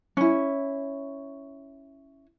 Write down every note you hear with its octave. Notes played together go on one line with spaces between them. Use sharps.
C#4 E4